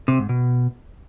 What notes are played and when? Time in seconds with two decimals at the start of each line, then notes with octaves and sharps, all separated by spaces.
0.08 C3
0.19 G#2
0.29 B2